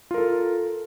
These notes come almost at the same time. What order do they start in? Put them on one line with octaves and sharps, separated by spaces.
F4 A#4 A4